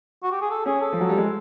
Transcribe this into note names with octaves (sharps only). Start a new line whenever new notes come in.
F#4
G4
G#4
A4
C#4 G#4
A4
F3
F#3
G3
G#3